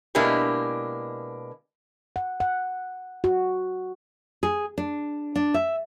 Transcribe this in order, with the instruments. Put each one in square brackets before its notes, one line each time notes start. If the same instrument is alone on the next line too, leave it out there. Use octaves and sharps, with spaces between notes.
[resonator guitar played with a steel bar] B2 G#3 A#3 D4 E4 G4
[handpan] F#5
F#5
F#4
[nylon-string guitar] G#4
D4
D4
E5